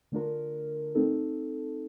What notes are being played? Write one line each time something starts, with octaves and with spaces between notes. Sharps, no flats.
D3 A3 D4 F4 A#4
A3 C4 D#4 A4